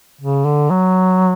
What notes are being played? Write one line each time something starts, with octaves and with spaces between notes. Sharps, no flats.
C#3
D3
F#3